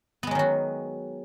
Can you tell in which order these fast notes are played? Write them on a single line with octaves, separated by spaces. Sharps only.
B3 G#3 F#3 D#3 F#4